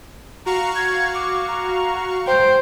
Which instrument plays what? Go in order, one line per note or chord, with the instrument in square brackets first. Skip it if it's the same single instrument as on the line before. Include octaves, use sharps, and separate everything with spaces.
[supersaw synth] F#4 F5 C#6 [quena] A#5
[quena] G#6
D6
A#5
[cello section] C5 [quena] G5